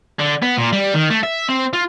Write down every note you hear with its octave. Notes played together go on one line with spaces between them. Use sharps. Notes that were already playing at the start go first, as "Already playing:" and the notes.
D3
B3
A#2
G3
D#3
A3
E5
C4
F4